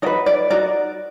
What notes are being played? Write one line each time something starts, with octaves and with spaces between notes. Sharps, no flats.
D#4 F#4 B4 D5
D5
D#4 F#4 A#4 D5